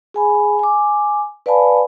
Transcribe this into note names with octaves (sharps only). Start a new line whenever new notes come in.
G#4 G#5 B5
G#5 D6
B4 D5 F5 G#5 A5 B5